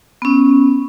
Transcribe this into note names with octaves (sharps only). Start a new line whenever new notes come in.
B3 C#4